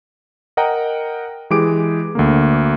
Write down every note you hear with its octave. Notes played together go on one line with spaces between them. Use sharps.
A#4 D#5 F#5 G5 A#5
E3 G#3 G4 G#4 D6 D7
D2 D3 A#3